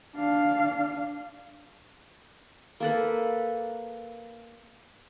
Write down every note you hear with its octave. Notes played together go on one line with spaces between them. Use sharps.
D4 F5
A#3 A4 B4